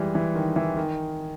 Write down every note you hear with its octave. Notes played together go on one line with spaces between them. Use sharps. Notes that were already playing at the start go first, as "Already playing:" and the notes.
Already playing: E3 G3 G#3
E3
D#3
E3
D#3